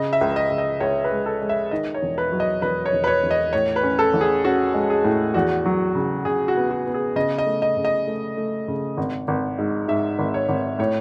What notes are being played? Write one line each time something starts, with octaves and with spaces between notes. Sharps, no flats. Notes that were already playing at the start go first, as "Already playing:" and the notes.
Already playing: C#3 D#5
E5
C#2
D#5
C#2
D#5
C#2 C#5
B4
G#3
A4
G#3
E5
D#3 D#5
C#5
E1
B4
F#3
D#5
E1 B4
C#5
E1
B4
C#5
E1
D#5
A2 C#5
B4
C#4
A4
A1
G#4
C#4 F#4
G#3
G#4
A2
E2 F#4
F#3
C#3
C#3 G#4
F#4
B3
F#4
B3
G#4
C#3 D#5
D#5
A3
D#5
C#3
D#5
A3
A3
C#3
G#1
G#1
G#2
G#2 E5
G#1
C#5
G#1
A2 C#5